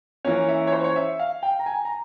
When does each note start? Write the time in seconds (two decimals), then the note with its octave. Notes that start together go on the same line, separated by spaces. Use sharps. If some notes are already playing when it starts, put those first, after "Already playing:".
0.25 E3 A#3 C#4 C#5
0.49 E5
0.67 C#5
0.72 C5
0.84 C#5
0.96 E5
1.19 F5
1.43 G5
1.59 A#5
1.66 G#5
1.85 A#5